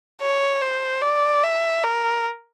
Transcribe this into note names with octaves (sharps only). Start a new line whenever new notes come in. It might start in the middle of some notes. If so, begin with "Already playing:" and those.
C#5
C5
D5
E5
A#4